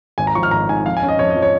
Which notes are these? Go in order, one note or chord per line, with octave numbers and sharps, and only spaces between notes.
G#1 G#5
A#5
F3 C#6
F6
G#1 A#5
G#2 G#5
F2 F5
G#5
C#4
D#5
F2 C#5
D#5
F3
C#5